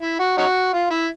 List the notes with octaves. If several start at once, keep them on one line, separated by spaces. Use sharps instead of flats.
E4
F#4
C#4 D#4 F#4
F4
E4